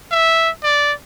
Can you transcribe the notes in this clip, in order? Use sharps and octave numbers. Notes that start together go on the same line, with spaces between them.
E5
D5